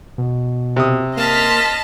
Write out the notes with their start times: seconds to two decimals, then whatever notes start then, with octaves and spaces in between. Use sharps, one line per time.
0.18 B2
0.76 C3 D#6
1.17 A#3 D#5 A5 C6 F6 B6